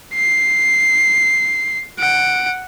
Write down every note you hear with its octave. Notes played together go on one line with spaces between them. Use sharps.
C7
F#5 D7